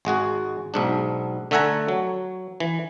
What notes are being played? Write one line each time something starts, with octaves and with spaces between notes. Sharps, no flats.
G#1 G#3 F#4 G#4
B1 G#2 D4
D3 A3 E5 F#5 G#5 A#5
F#3
E3